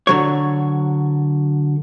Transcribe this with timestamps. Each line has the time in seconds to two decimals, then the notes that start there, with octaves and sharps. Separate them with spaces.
0.07 D3 F#3 C#5